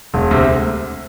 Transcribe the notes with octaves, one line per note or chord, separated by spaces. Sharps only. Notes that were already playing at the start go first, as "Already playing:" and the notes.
E1
D2 C3